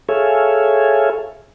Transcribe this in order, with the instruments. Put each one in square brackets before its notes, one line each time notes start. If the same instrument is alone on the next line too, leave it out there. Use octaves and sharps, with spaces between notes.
[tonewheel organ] G#4 A4 C#5 E5 F5 G#5